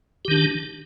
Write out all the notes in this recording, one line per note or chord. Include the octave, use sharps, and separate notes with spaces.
D#3 D4 G4